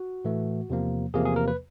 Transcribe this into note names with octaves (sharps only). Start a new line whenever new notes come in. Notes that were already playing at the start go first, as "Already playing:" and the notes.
Already playing: F#4
A2 E3 A3
E2 C3 F3 A#3
E2 C3 F3 A#3 G#4
G#4
A#4
B4